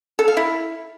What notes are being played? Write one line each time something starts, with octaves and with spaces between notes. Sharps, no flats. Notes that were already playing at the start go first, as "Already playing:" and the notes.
A4
F5
E4